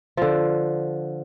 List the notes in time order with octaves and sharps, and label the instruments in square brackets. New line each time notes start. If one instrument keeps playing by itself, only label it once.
[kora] D3 F3